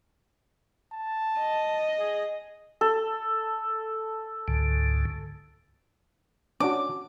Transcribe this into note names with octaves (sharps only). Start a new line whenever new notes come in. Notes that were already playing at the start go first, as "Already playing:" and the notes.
A5
D#5
G#4
A4
C#2 G#2 D3
C#4 D4 F#4 D6